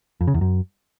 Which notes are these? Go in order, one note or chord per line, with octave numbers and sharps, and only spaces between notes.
F2
C#3
E2
F#2